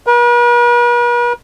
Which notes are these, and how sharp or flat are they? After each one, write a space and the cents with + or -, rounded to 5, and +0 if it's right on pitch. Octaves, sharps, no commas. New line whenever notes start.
B4 -45